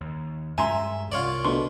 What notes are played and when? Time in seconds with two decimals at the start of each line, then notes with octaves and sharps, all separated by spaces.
0.01 D#2
0.58 G2 G#3 C#4 E5 G#5 A#5 C6
1.12 C2 F4 C#5 D5
1.45 D2 B2 C6 C#6